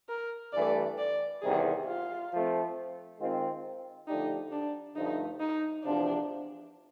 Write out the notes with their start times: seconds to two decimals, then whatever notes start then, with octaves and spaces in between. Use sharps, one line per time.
0.09 A#4
0.53 G2 E3 A3 D5
0.98 D5
1.41 E2 C3 D#3 G3 G#4
1.86 F4
2.31 F3 A3 C4
3.18 D#3 G#3 C4 F4
4.07 D3 F3 A3 D4 D#4 G4
4.52 D4
4.96 G2 D3 F3 A3 D#4
5.40 D#4
5.84 E2 C3 F3 D4